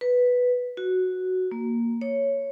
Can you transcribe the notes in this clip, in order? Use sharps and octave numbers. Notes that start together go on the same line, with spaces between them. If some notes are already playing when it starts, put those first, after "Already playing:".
B4
F#4
A#3
C#5